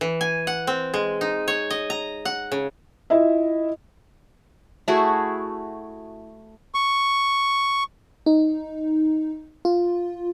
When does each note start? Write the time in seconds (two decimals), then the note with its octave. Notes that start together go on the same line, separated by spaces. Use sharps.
0.01 E3
0.21 G#5
0.47 F#5
0.67 C4
0.94 G#3
1.21 D#4
1.48 C#5
1.70 D#5
1.90 A#5
2.25 F#5
2.52 C#3
3.10 E4 F4 D#5 E5
4.88 A3 E4 F#4 G#4
6.74 C#6
8.26 D#4
9.65 F4